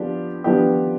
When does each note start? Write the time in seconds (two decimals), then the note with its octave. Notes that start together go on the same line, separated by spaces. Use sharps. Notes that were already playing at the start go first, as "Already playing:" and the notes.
Already playing: F3 B3 D4 G4
0.44 F3 B3 D4 G4